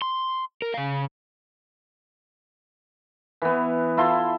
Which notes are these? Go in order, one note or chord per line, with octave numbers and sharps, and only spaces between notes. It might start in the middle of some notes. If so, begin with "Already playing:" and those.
C6
A#4
C#3 F5
E3 B3
E4 F4 A4 C6